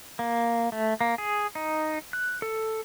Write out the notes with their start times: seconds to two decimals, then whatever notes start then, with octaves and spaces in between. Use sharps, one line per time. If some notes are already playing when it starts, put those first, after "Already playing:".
0.19 A#3
0.72 A3
1.01 A#3
1.18 G#4
1.55 D#4
2.13 F#6
2.42 A4